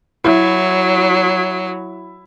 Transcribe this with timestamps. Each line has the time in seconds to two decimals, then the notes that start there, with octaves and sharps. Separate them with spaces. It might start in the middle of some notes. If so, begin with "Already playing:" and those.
0.24 F#3 E4